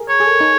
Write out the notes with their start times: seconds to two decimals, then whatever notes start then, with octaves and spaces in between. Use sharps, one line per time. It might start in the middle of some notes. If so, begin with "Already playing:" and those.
Already playing: G#4 A#4
0.09 C#5
0.20 G#4
0.25 A4
0.41 D#4